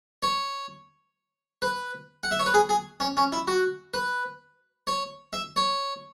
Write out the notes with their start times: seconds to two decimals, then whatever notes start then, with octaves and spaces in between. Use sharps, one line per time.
0.23 C#5
1.62 B4
2.23 F#5
2.31 E5
2.39 C#5
2.46 B4
2.54 G#4
2.69 G#4
3.00 C#4
3.17 C#4
3.32 E4
3.48 F#4
3.94 B4
4.87 C#5
5.33 E5
5.56 C#5